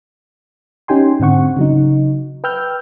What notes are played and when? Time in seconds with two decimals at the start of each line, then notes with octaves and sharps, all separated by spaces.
0.88 C#4 D#4 G4 G5 G#5 C6
1.20 G#2 D3 C4 F#5 C#6
1.57 C#3 F#3 D#4
2.44 B4 G5 E6 F6 G6